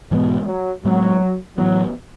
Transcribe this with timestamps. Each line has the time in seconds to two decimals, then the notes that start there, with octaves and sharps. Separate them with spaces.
0.11 G#2 B2 E3 G#3 B3
0.47 F#3
0.85 A2 F#3 G#3 B3
1.57 A2 E3 F#3 B3